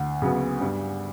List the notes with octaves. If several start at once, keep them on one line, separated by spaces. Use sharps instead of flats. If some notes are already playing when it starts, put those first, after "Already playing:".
Already playing: D2 F#5
C#3 F#3 B3
G2